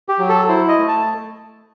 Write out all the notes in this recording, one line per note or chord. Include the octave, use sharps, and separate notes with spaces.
G4
F#3
A4
E4 C5
D#5
A3
A5